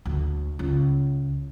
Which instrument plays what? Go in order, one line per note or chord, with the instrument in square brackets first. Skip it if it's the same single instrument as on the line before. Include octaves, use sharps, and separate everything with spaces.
[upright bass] D2
C#2